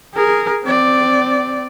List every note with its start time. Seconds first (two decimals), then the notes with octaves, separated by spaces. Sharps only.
0.14 G#4 A#4
0.63 C4 D5